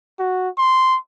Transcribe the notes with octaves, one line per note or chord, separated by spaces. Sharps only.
F#4
C6